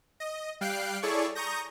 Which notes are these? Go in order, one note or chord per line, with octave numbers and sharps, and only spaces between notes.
D#5
G3 F5 G5 F#6 C7 D7
E4 G#4 A4 C#5 D5 C#6
A#5 C#6 D#6 G6 A#6